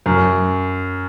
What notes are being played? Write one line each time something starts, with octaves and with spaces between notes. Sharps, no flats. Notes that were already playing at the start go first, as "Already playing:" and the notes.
F#2